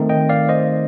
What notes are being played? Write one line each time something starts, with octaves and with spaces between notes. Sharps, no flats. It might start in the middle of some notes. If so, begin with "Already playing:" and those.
Already playing: D#3 A3 C4 D#4
D#5 G5
D5 F5
C5 D#5